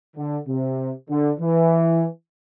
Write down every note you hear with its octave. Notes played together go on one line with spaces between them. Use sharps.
D3
C3
D3
E3